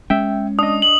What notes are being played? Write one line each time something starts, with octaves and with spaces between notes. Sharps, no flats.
G#3 C#4 E5 G5
D4 D#5 D#6
F#7